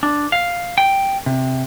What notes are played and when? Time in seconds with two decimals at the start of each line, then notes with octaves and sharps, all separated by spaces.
0.03 D4
0.32 F5
0.78 G5
1.26 C3